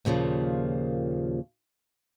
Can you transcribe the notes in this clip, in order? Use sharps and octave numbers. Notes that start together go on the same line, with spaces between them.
D#2 A#2 C#3 E3 F3